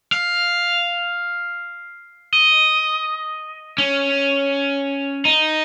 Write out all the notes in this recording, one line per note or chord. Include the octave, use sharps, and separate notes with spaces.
F5
D#5
C#4
D#4